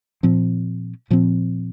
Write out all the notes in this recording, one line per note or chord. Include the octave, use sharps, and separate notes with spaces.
A#2 F3 C4
A#2 F3 C4